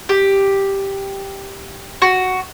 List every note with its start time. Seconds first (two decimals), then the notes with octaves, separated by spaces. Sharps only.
0.09 G4
2.02 F#4